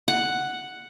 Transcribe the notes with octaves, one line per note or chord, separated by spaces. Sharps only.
F#5